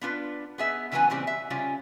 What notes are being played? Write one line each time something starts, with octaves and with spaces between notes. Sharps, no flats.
B3 D4 F4 B4
B3 G#4 E5
C#3 E3 F#3 B3 B4 G#5
A#2 C#3 E3 G3 C4
E5
C#3 G3 C#4 F4